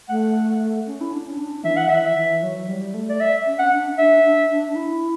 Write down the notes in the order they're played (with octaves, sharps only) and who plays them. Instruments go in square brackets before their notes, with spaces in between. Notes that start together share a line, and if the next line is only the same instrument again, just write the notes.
[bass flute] A3 [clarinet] F#5
[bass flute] C#4
E4
D4
C#4
D4
[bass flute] E3 [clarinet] E5
[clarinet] F#5
[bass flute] E3 [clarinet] E5
[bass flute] E3
F#3
G3
A3
[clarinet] D5
E5
[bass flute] C#4
[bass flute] C#4 [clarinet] F#5
[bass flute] D4
[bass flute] D4 [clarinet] E5
[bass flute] D4
D4
D4
E4